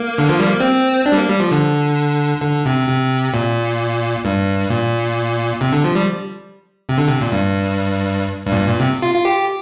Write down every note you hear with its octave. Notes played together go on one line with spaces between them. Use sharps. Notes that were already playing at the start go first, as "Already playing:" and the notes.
Already playing: A#3
D3
F3
G3
A#3
C4
D4
G3
A#3
G3
F3
D3
D3
C3
C3
A#2
G2
A#2
C3
D3
F3
G3
C3
D3
C3
A#2
G2
G2
A#2
G2
A#2
C3
F4
F4
G4